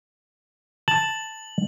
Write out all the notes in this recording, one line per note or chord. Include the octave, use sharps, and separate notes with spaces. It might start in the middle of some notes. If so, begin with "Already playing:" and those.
A5 F#7